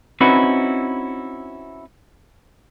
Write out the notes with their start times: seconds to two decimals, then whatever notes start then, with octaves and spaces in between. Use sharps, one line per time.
0.21 C4 C#4 D#4 E4 F#4 B4